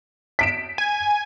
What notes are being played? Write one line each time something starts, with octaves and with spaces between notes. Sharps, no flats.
B6 D7 E7
G#5